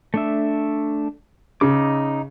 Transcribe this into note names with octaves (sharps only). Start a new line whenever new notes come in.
A3 D4 E5
C#3 D#4 D6